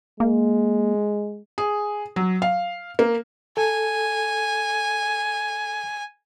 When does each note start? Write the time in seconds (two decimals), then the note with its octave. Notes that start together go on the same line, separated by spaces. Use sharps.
0.20 G#3 A#3
1.58 G#4
2.16 F#3
2.42 F5
2.99 A#3
3.57 A4 G#5